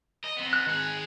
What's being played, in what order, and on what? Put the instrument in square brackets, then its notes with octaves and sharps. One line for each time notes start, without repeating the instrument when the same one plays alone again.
[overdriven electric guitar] D#5
B3 C4
[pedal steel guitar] F#6
[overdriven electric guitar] D#3 G#4